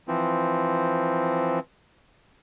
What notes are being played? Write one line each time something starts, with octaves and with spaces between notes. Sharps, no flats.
E3 F3 C4